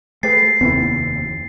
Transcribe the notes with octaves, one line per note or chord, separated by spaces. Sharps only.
A3 G4 G#4 B4 A6 C7
F1 D#2 B3 C4 E4